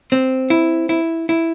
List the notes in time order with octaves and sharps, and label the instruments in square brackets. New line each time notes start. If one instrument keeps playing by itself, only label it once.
[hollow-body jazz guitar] C4
E4
E4
E4